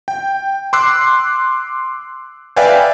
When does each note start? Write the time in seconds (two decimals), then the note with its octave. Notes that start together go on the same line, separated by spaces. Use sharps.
0.08 G5
0.73 C6 D6 E6 F#6 C7
2.56 B4 D5 E5 F5 G5 G#5